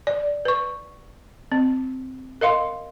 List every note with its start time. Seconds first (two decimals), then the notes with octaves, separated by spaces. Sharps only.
0.07 D5
0.45 B4 C#6
1.52 C4
2.41 A#4 D#5 F5 C6